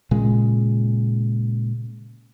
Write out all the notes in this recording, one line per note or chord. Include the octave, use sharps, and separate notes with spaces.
A#2 C#3 G#3